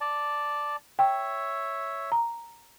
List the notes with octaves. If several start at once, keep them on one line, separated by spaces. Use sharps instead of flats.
D5 A5
C#5 E5 G5
A#5